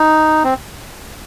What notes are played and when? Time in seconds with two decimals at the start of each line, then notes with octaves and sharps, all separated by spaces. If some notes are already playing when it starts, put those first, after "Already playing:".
Already playing: D#4
0.44 C4